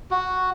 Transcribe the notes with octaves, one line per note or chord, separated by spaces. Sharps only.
F#4